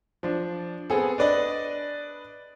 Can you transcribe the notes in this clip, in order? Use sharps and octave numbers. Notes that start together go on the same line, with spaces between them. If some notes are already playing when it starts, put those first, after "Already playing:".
F3 D4
B3 C4 G#4 A4
D4 B4 D5 D#5